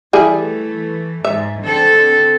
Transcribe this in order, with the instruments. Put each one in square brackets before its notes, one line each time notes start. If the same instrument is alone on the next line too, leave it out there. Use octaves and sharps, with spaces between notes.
[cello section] E3 A3 [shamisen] G3 E4 G#4
[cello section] G#2 [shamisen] E5
[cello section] D3 C4 A4